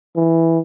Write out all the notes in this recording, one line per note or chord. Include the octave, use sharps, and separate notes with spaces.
E3